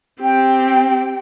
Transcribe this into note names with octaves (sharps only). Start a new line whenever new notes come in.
C4 G4 G5